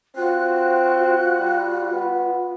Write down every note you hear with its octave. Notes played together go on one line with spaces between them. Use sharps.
C4 F4 F#4 F#6
G3
B3